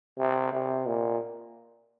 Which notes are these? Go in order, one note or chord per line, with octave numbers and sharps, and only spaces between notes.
C3
C3
A#2